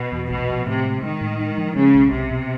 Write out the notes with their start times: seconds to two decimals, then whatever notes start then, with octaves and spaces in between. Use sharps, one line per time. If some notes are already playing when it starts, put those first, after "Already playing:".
Already playing: B2
0.12 E2
0.30 A#1 B2
0.49 F3
0.67 A2 C3
0.85 G#3
1.02 D#3 G#3
1.21 A2
1.40 G#3
1.58 F3
1.76 C#3 G#3
1.95 B1
2.12 B1 C3
2.30 B2